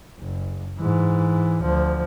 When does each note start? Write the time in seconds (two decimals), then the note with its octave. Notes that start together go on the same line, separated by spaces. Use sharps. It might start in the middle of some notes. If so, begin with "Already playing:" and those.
0.19 F#1
0.79 G#2 E3
1.63 D2 F3